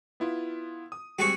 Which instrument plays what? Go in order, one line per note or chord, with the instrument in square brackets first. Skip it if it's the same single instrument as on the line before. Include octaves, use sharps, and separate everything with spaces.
[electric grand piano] B3 E4 F4
D#6
[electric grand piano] G3 G#3 C4 [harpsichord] F#4 G#4 C#6